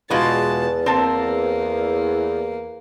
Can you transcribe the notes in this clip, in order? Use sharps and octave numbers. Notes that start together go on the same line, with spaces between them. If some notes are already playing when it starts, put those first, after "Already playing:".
E2 B2 G#3 F4 A5
A#3 C4 A5